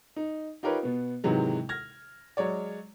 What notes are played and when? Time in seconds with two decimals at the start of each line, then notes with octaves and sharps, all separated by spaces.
0.16 D#4
0.63 D#4 F4 G4 A#4 B4 C#5
0.83 B2 B3
1.24 G#2 C3 D#3 E3 F#3 G#3
1.69 F6 G#6 A#6
2.37 F#3 G#3 C#5 D5